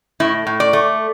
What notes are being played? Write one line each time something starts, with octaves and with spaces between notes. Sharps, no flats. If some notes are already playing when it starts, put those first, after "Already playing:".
A2 E4
A2
D5
A3